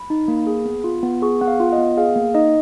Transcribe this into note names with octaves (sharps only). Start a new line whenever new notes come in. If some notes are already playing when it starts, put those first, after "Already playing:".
Already playing: B5
D#4
A#3
G#4
B3
F4
B3
G#4 C#6
B3 F#5
F5
F4
D#5
B3
G#4 F5
A#3
D#4 D#5